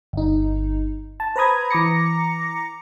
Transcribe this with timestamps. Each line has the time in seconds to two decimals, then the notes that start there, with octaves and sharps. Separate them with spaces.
0.13 G1 D#4
1.20 A5
1.36 B4 C5 A#5 B5 D#6 G#6
1.70 E3 A#5 D6 A#6 C#7